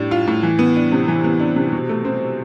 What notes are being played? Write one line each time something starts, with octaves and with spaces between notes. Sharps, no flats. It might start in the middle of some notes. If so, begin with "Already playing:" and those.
Already playing: A2 G3 D4
F4
A2
E3
B3
D4
C3
E3
B3
D4
C3
B2
A3
C4